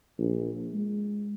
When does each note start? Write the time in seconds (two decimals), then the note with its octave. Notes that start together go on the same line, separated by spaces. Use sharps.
0.19 A#1
0.74 G#3